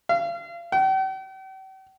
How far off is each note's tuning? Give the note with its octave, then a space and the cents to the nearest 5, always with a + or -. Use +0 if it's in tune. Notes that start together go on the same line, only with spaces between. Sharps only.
F5 -35
G5 -45